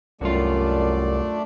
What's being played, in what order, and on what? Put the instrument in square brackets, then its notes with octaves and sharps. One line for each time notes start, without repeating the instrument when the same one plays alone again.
[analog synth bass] C2 [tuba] F#2 [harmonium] A3 D4 D5 [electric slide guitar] F4 F#4